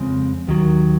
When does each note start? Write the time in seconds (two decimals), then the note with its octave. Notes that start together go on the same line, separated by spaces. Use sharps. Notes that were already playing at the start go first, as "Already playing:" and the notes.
Already playing: F2 C#3 G#3 C4
0.47 D#2 D#3 F#3